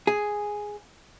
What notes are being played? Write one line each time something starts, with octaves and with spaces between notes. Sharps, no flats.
G#4